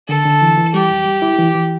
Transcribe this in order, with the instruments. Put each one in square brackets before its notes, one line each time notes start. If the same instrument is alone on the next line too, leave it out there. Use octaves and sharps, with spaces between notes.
[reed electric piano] D3 [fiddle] A4
[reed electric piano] D3
E3
E3
[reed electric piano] G3 [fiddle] G4
[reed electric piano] E2
G3
E4
E3
E3